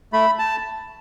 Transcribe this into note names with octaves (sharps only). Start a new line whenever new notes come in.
A3 B5
A5